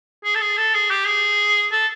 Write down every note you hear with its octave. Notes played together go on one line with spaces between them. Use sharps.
G#4
A4
G#4
A4
G#4
G4
G#4
A4